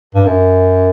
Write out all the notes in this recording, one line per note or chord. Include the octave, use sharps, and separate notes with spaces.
G2
F#2